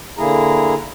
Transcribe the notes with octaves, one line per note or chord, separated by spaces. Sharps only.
D3 A#3 E4 G#4 A#5